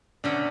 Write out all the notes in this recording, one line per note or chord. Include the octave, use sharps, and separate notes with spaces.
B2 F#3 A3 C#4 D4